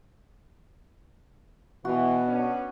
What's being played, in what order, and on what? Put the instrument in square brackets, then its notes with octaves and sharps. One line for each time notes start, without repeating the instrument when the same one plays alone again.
[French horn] B2 [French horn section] E3 [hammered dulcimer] F#4
[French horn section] B3 C#4 D4